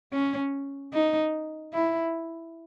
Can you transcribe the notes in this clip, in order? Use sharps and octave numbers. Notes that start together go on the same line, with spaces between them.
C#4
D#4
E4